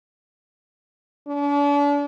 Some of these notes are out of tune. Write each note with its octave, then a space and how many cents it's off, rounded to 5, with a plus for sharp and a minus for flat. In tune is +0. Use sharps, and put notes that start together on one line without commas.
D4 -40